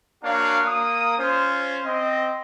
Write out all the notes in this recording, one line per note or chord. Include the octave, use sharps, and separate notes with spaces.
A#3 D4 F#4 C#5 F5
A#3 D#6
C#4 F4 C5
C4 D#5